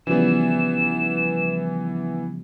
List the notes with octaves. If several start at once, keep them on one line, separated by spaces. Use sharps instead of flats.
C#3 E3 F3 G3 B3 E7